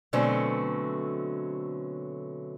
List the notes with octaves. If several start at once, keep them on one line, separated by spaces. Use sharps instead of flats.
B2 D3 F#3 A3 C4 C#4